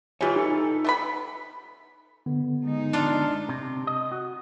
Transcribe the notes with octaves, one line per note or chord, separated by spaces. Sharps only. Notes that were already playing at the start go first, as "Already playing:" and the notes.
E3 G#3 F4 G4 C#5
D#4 A4
A3 B3 B5
D3 B3
G#3 D#4
D4 F4
C3
D#5
F#4